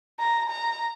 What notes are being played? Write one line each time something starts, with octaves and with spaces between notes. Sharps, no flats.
A#5
A#5